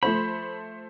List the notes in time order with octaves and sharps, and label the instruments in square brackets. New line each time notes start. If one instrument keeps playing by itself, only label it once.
[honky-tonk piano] F3 A3 C5 [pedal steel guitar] B5